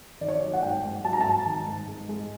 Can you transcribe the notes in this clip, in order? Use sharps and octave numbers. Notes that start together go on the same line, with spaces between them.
D#3 D5
C#5
D5
F#3
F#5
G#2 G5
G#2
F#3 A5
A#5
G#2 A5
D#3
G#2
G#3
G#3